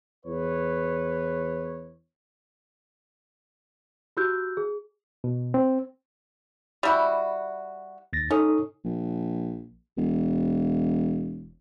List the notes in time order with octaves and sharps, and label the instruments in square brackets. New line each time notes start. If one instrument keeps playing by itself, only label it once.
[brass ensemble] E2 B4 C#5
[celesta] E4 F#4 G4 E6 F#6 G6
G#4
[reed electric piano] B2
C4
[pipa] G3 E4 F#4
[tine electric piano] D#2 A6 A#6
[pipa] C#4 [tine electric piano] D#4 A4 D#6
[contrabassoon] A#1
E1